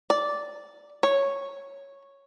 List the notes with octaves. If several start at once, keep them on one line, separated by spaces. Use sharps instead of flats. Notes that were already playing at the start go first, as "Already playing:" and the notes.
D5
C#5